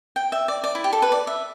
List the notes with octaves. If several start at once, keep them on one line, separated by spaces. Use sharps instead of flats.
G5
E5
D5
D5
E4
G4
A4
B4
D5
E5